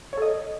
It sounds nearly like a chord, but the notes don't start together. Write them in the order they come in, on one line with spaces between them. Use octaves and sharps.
C#5 A4 D#5